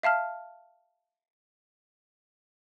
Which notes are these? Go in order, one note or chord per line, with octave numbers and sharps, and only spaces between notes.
E5 F5 A5 F6